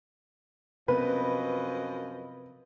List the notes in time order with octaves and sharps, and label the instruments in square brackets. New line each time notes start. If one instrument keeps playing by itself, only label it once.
[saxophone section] F#2 F3 D#5 [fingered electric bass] C3 B3 C4 [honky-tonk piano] B4